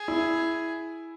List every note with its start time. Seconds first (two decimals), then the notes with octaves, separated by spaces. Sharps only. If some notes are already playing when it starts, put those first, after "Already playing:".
Already playing: G#4
0.08 E4